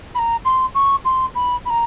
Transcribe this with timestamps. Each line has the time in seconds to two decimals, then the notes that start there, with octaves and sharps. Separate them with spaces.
0.14 B5
0.18 A#5
0.45 C6
0.74 C#6
1.04 C6
1.35 B5
1.65 B5
1.69 A#5